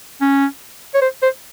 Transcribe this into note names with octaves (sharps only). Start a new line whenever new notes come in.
C#4
C#5
C5
C5